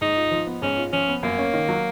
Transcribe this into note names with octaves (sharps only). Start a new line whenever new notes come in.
G#2 D#4
F4
F3
B3
G#2 C#4
F4
F3 C#4
B3
F#2 A#3
C#4
D#3
F#3